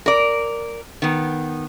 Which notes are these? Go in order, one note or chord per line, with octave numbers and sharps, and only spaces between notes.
A#4 D5
D#3 B3